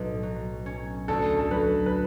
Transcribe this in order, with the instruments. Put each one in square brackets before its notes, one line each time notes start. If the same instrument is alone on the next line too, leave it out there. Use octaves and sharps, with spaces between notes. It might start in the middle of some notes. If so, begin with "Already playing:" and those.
Already playing: [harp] B1 A2
F#3
C#4
[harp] D2 [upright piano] A4
[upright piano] A4
[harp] F#3 [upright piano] B4
[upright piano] B4